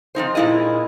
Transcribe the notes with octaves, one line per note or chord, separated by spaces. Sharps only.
F3 C4 D#4 C5
A#2 G#3 E4 G#4 D#5